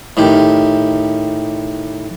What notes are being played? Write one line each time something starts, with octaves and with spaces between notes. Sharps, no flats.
A2 D#3 G4